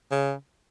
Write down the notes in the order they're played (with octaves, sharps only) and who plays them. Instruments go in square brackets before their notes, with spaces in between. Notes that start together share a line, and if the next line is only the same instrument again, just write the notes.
[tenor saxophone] C#3